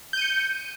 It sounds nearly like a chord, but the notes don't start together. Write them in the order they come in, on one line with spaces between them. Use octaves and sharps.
G6 D#7 C#7